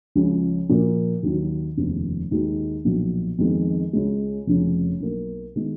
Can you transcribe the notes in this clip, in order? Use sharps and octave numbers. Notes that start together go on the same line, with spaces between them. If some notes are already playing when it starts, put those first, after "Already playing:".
C#2 C#3 F3
A#2 F3 A#3
D#2 D#3 F#3
F1 D#2 C#3 F3 B3
D#2 D#3 G#3 D#4 F#4
B1 A#2 F3
F2 D#3 G#3 B3
C#2 C#3 G#3
F1 F2 C#3 F3
B1 B2 A#3
D#3 G#3 B3